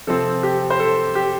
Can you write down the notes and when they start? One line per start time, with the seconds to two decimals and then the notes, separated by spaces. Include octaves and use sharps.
0.07 C3 F3 C4 A4
0.43 G4
0.70 C5
0.80 A4
1.15 G4